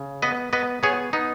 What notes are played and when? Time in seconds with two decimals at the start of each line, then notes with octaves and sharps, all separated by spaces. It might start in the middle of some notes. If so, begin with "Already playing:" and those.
Already playing: C#3
0.22 B3 B4 D#5
0.53 B3 B4 D#5
0.83 B3 G#4 C#5
1.13 B3 D#4